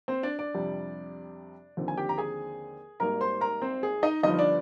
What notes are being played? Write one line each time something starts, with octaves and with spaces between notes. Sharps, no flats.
C4 C5
D4 D5
D4 D5
F2 C3 G3
D#2 D3 F3 C4
G#5
G4 G5
A#5
G#4 G#5
G#1 G#2 G3 A#3 A#4 A#5
C5 C6
A#4 A#5
C4 C5
G#4
D#4 D#5
G1 G2 F3 D#4 D#5
D4 D5